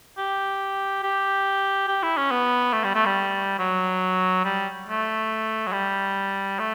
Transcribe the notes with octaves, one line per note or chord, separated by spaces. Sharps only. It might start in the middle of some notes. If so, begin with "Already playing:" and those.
G4
G4
G4
E4
C#4
B3
A3
G3
A3
G3
F#3
G3
A3
F#3
G3
A3